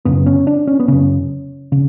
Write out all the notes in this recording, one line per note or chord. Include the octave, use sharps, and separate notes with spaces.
F#2 C#3 B3
C#4
D4
C#4
B3
F#2 C#3 C#4
C#3